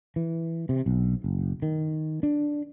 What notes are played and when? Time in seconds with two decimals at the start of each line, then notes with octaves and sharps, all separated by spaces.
0.16 E3
0.69 C3
0.86 B1
1.24 F#1
1.62 D#3
2.23 D4